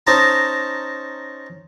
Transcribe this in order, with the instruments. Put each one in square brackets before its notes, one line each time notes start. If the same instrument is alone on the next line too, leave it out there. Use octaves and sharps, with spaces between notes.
[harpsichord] C#4 D#4 C5 D#5 A5 A#5